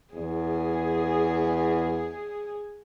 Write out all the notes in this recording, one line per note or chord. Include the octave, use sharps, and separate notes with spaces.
E2 G#4